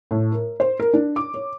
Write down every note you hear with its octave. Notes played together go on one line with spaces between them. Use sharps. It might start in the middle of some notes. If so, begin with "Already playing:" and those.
A2
A#4
C5
A#4
D4
D6
C#5